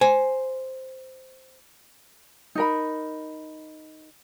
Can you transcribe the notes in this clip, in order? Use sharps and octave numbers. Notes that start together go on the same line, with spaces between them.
C5 G#5
D#4 A#4 B5